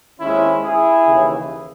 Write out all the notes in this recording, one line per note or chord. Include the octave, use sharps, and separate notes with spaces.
D#2 D#3 G#3 C4 C#4 E4
E4 G#4
D#2 C#3 E3